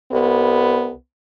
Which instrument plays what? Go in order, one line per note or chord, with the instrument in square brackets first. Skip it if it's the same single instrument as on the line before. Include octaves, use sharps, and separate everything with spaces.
[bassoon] C2 [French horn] B3